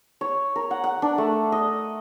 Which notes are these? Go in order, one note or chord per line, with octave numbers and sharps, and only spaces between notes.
C#5
A#4
F#5
F#5
D4
A3
D#5